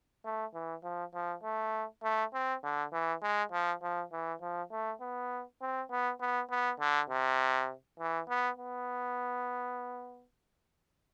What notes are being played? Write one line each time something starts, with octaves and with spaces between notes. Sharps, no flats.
A3
E3
F3
F3
A3
A3
C4
D3
E3
G#3
F3
F3
E3
F3
A3
B3
C4
B3
B3
B3
D3
C3
E3
B3
B3